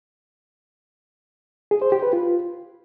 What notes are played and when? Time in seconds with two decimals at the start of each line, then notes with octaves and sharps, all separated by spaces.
1.71 G#4
1.82 C5
1.92 G4
2.02 B4
2.13 F4